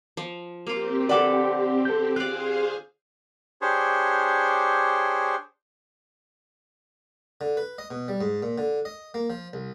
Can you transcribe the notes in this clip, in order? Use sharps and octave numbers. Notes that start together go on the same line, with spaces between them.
F3
A#3 C4 F4 G4
D3 A4 B4 D5 F#5 D6
A4 G6
F4 G#4 C5 D5 F5 F#6
D4 G4 G#4 C5 C#5
D3
B4
D#5
B2
G3
G#2
A#2
D3
D#5
A#3
F3
C2